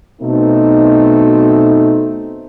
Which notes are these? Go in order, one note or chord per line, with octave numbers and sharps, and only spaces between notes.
B2 A3 C4 D#4